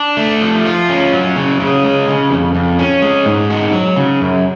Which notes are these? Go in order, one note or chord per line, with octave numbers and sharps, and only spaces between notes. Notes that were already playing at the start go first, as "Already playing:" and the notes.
Already playing: D4
A3
F3
F4
C#4
F#3
C#3
C#3
G#3
C#3
F2
F2
C#4
G#3
G#2
F#4
F#3
C#3
F#2